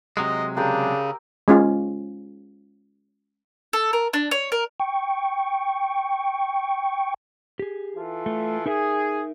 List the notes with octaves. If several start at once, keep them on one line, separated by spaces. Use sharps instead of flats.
C3 F#3 G#3 D#5
C#3 D4 G4 A#4 E6
G#3 C#4 F4
A4
A#4
D4
C#5
A#4
G5 C#6
G4 G#4
E3 F4 A4
A3
D#4 G#4 A#4 E5